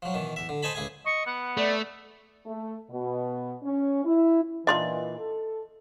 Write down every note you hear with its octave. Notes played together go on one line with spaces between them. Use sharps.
F3 F#3
B2 D#3 E3
E2 E5
D3
C5 D#5 G#5 A5 B5
C#2 E4 G#4 G#5
D#5 C#6
B3 F#5
A3 D5
A3
B2
C#4
E4
A#2 E3 D4 D#4 F4 D#5 C6
A4